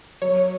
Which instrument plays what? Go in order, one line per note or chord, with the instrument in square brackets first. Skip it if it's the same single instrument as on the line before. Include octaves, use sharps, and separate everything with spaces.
[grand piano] F#3 [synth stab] C#5